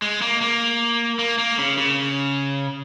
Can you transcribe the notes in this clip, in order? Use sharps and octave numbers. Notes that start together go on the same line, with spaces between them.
G#3
A#3
A#3
A#3
A#3
C#3
C#3